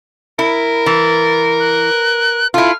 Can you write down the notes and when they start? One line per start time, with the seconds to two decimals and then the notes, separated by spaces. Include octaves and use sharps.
0.39 E4 A#4
0.86 E3 A6
1.60 F#6
2.54 E4 F4 A4 F6